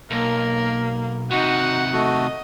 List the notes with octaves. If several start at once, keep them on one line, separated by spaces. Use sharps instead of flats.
B1 A#3 A#4
C3 D#3 D#4 F#4 F#5
A3 F#4 D#5